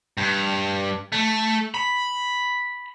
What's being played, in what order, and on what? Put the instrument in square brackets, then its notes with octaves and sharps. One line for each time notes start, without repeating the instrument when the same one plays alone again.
[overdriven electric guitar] G2
A3
B5